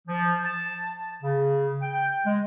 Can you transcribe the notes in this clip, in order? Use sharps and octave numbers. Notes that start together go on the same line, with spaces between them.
F3
A5
C#3
G5
G#3